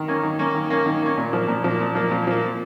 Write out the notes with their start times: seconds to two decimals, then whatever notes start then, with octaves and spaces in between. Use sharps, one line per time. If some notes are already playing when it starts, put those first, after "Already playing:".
Already playing: D#3
0.08 A#3 C#4
0.23 D#3
0.39 A#3 C#4
0.54 D#3
0.70 A#3 C#4
0.86 D#3
1.02 A#3 C#4
1.17 A#2
1.33 F3 A#3
1.48 A#2
1.64 F3 A#3
1.80 A#2
1.95 F3 A#3
2.11 A#2
2.27 F3 A#3